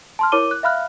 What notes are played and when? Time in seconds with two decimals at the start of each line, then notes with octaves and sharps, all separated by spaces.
0.19 A5 C6 F6
0.32 E4 A#4 C#5 D6 D#7 G7
0.51 F#6
0.63 E5 F5 B5 F6 F#6